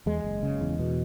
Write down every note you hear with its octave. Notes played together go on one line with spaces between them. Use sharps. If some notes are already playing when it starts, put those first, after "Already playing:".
E2 G#3
F#1
C#3
E2
B2